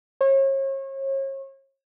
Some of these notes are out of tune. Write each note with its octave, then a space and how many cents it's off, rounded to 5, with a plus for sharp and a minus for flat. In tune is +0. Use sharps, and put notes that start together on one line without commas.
C#5 -40